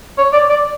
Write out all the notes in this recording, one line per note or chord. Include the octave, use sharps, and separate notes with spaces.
C#5
D5
D5